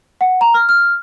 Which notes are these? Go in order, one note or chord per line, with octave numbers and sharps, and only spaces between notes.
F#5
A#5
F6
F6